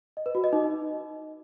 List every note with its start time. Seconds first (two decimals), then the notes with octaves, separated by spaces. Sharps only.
0.17 D#5
0.26 B4
0.35 F#4
0.44 D#5
0.53 D#4